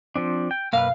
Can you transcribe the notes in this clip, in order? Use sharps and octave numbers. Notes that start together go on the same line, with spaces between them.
F3 C4 D4
G5
B1 F#2 A#3 B4 F5